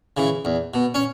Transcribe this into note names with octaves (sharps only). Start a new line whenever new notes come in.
C#3 E3
E2
B2
C#4